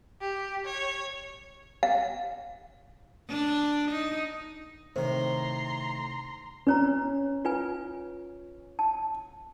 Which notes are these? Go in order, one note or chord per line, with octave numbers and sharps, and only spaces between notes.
G4
C#5
F5
D4
D#4
A2 C3 D#3 C5 A#5 C6
C#4 B4 C#5 A#5
F4 B4 G#5
A5